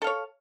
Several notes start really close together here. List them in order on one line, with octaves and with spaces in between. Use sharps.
A4 F5 C#5